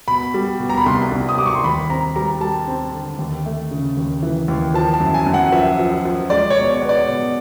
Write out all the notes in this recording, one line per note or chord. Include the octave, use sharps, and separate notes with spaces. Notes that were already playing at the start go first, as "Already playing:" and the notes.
B2 B5
G3
B2
A#5
B5
C2 C6
C2
D#6
G3 D6
C#6
C6
D#2 B5
C4 A#5
G3 A#5
G3 A5
C4
D3
D#2
A3
C#3
D#2
E3
D#2
F3 A5
A5
F#2
G#5
F#2
F#5
F3 E5
F3
F3
G#3 D5
C#5
B2
C#5
B3
D5
B2